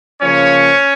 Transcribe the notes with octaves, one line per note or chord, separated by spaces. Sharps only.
C#3 F3 A#3 C#4 C#5